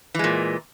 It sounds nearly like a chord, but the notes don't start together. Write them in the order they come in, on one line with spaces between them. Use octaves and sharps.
E3 G#3 A#2